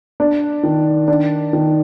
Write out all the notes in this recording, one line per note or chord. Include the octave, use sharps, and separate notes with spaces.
D4
D#3
D4
D#3